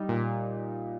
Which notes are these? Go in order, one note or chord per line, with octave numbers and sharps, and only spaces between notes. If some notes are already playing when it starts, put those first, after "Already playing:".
Already playing: G3 D#4
A#2